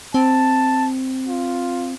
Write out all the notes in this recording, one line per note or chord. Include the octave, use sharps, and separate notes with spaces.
C4 A5
F4